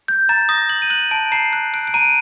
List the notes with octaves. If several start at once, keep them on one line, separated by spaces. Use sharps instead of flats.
G6
A#5 A6
D#6 A#6
G6 F#7
D#7
F#6 F#7
A5 D7
A#5 C7
F#6
F#6 D7
D7
A#5 D#7